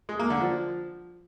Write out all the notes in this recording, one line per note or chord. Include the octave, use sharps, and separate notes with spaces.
G#3
A#3
D3
F3